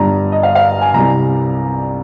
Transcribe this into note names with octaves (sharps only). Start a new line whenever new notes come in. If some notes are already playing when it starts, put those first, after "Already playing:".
Already playing: G1 G2 G3 A#5
D#5
F5
F5
G#5
C2 C3 G3 A#5